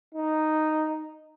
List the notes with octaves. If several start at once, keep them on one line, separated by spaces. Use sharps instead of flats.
D#4